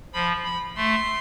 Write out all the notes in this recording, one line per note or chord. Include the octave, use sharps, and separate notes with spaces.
F3 B5
B5
A3 C6